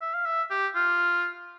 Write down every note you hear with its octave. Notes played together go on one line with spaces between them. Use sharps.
E5
F5
E5
G4
F4